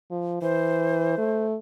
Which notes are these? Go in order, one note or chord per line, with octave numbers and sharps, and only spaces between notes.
F3
E3 C5
A3